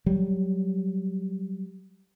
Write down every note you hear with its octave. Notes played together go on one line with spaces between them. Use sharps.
F#3 G3